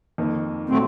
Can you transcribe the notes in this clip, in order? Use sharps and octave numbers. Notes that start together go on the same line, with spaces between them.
F2 D#3 A#3
A#2 F#3 A3 C4